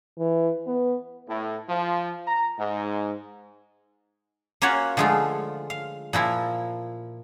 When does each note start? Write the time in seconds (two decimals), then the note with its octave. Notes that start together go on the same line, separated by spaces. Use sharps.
0.19 E3
0.67 B3
1.28 A2
1.69 F3
2.27 A#5
2.59 G#2
4.62 A#3 C#4 F4 F#4 C#5 F#5
4.97 D3 F3 G#3 A3 F4
5.70 F5
6.13 A#2 F3 E4 A#4